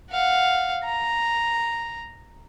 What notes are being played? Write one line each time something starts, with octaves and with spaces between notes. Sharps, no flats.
F5 F#5
A#5